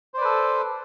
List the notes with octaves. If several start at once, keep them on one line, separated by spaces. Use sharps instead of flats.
A4 B4 C5 D5